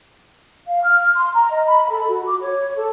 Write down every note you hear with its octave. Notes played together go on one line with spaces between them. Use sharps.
F5
F6
C6
A#5
D#5
B5
A4
F#4
D6
C#5
A4